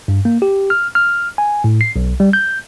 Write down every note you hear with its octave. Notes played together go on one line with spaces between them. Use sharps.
G2
A#3
G4
F6
F6
G#5
A2
C7
B1
G3
G6